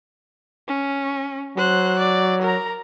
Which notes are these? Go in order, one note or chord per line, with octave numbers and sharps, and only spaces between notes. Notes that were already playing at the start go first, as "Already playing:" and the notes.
C#4
F#3 C5 F#6
D5
A#4 A#5